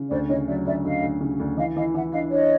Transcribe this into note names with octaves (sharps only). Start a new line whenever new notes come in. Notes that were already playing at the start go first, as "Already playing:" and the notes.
Already playing: C#3
D2 C5 D5
C#3 C#5 D#5
F#3 D5 E5
D2 D5 E5
D2 D#5 F5
D2
C#3
D2
E3 D#5 F5
E3 D#5 F5
E3 E5 F#5
D4 D#5 F5
D4 C#5 D#5